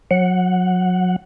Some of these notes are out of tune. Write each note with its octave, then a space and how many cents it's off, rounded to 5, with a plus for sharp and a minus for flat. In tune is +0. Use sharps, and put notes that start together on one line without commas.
F#3 -30 F#5 +0